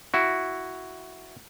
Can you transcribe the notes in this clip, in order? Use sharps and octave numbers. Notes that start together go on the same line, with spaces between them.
E4 F#4